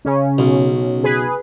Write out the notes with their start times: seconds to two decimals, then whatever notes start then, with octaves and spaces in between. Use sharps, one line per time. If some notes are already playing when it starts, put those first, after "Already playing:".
0.05 C#3 C#4
0.38 B1
1.03 G#4 B4